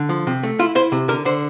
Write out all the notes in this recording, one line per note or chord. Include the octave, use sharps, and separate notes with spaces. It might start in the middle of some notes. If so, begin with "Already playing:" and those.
Already playing: D3
F3
C3
A3
E4 F4
E4 C5
C3
D3 A#4
D3 C5